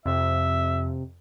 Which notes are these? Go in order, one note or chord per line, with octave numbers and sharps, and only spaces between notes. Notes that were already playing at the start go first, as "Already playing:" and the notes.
F2 C3 E5